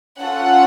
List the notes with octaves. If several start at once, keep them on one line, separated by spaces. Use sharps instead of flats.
C#4 F4 A4 F#5